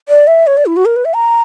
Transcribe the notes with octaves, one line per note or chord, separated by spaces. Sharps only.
D5
E5
C#5
D5
E4
F#4
A#4
B4
E5
A#5